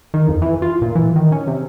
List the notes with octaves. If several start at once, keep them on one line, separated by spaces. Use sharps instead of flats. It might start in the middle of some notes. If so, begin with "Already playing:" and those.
D#3
F2
E3
F4
A#2
E3
D#3
C#4
C3